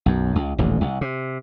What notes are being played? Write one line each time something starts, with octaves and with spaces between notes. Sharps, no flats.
B1 F#2
C#2
D#1 A1 D2
C2
C3